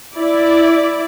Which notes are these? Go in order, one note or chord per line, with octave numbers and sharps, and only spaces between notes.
E4 D5